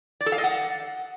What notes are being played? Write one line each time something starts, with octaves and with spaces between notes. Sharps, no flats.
D5
A4
F5
D#5
F#5